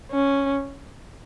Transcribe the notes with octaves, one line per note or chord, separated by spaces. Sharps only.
C#4